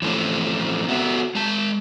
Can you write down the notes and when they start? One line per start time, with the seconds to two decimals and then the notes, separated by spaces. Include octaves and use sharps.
0.02 E3 F3 A3 C4 C#4
0.88 B3 F#4 A4 E5
1.35 G#3 A5